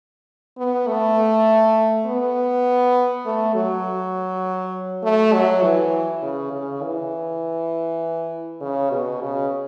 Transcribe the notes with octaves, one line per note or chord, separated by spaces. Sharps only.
B3
A3
B3
A3
F#3
A3
F#3
E3
C#3
C#3
E3
C#3
B2
C#3